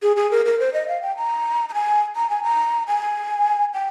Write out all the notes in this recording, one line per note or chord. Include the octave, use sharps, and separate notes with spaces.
G#4
G#4
A#4
A#4
C5
D#5
F5
G5
A#5
A#5
G#5
A#5
G#5
A#5
G#5
G5